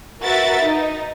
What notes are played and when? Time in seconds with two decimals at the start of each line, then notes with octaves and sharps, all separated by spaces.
0.22 F#4 A#4 B4 E5 A6
0.64 D#4